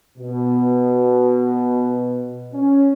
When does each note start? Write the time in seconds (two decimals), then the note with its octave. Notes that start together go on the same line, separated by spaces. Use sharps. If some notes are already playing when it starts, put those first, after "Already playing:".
0.18 B2
2.54 C#4